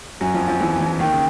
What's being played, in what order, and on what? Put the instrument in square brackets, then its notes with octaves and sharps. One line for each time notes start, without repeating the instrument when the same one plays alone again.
[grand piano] F#2 F#3 [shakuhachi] G#5
[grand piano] F2 F3
F2 F3
E2 E3
E2 E3
[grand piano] D#2 D#3 [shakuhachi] G5
[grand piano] C#3